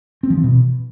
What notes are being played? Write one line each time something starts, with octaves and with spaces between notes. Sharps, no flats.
C4
F3
E3
B2